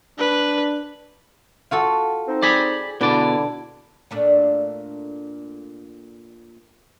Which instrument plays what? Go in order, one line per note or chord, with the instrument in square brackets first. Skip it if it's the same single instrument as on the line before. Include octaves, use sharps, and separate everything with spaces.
[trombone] D4 [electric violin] B4
[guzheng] F4 F#4 A4
[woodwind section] C4 D#4
[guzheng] G#4 [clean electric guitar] D5 B5
[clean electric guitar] B2 D5 [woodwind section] D3 E4 [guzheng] D4 B4
[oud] A#2 A3 D4